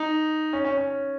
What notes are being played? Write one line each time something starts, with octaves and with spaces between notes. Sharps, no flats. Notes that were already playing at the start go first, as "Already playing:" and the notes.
Already playing: D#4
C#4
C#4
C#4